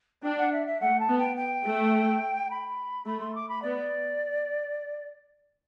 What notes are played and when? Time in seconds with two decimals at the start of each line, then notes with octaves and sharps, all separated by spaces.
0.23 D4 G5
0.38 F#5
0.51 E5
0.66 E5
0.80 A3 F#5
0.99 A5
1.08 B3
1.18 G5
1.36 G5
1.64 A3
2.50 B5
3.06 A3 B5
3.20 C6
3.34 D6
3.48 B5
3.62 B3 D5